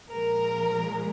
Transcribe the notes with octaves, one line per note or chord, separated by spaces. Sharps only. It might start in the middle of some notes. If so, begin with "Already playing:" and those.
A#2 F3 G#3 A#4